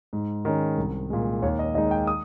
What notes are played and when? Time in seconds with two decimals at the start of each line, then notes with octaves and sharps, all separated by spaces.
0.13 G#2
0.45 D#3 G#3 C#4
0.77 C2
1.10 A#2 G#3
1.42 D#2 C#5
1.59 D#5
1.74 D#3 G#3 D#4 D#5
1.91 G5
2.07 D#6